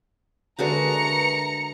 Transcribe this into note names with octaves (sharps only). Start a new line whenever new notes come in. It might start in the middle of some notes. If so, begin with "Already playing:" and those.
D3 G#3 F#4 A#4 B4 E5 A#5 C#7